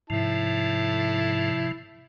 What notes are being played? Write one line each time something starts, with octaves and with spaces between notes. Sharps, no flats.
G#2 C3 F3 E4 A5